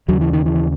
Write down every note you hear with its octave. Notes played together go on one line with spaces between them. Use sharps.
D#2 C#3 F#3
E3
D#3
E3